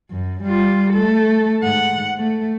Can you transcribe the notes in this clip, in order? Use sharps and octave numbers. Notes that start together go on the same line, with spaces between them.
F#2
G3 F4
A3 A4
G#2 F#5
A3